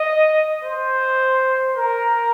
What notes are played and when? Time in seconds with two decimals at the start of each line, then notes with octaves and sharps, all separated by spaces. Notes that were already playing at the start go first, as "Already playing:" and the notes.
Already playing: D#5
0.64 C5
1.75 A#4